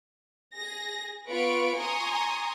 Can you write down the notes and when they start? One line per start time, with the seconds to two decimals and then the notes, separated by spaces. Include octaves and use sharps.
0.55 G#4 A#6
1.30 B3 F4 B4 C#6 D7
1.79 G#5 A#5 C6 C#6 D#6